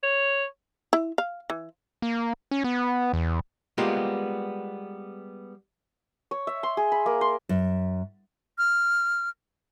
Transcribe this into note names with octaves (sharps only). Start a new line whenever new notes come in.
C#5
E4
F5
E3
A#3
C#4
B3
E2
G3 G#3 A#3 B3 F4 G4
C#5
E5
C6
G#4
B5
A#3
C6
F#2
F6